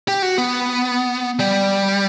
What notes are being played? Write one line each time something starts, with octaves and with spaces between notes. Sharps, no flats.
G4
F#4
B3
G3